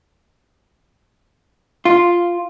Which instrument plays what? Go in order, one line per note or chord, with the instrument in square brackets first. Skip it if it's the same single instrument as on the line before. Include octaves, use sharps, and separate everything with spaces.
[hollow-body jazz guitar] F4